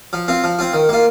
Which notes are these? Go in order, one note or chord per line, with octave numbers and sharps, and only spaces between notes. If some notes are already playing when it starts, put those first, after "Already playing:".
F3
C4 F4
F3
C4 F4
D#3
A#3 F4